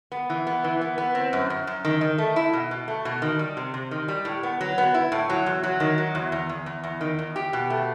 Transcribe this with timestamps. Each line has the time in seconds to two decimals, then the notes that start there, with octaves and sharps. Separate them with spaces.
0.12 B3
0.30 E3
0.47 B3
0.64 E3
0.81 B3
0.98 B3
1.15 C4
1.33 F#2
1.50 F#2
1.67 F#2
1.85 D#3
2.01 D#3
2.18 A3
2.36 E4
2.53 B2
2.71 B2
2.88 A3
3.05 B2
3.22 D#3
3.39 G3
3.57 C3
3.74 C3
3.91 D#3
4.08 G3
4.25 A2
4.43 B3
4.61 F#3
4.78 B3
4.94 E4
5.12 A2
5.29 F#3
5.46 E2
5.63 F#3
5.80 D#3
5.98 F#3
6.15 E2
6.32 E2
6.49 E2
6.66 E2
6.83 E2
7.01 D#3
7.19 E2
7.36 G4
7.53 B2
7.70 A3